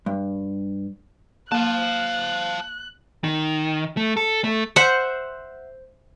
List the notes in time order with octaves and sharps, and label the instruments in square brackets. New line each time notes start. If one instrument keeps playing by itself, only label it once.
[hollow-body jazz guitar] G2
[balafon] A#3 [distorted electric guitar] F5 A5 [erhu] F#6
[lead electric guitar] D#3
A3
A4
A3
[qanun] C5 E5 F#5